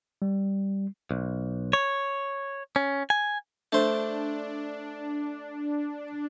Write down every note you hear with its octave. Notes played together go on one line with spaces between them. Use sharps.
G3
B1
C#5
C#4
G#5
A3 D4 C5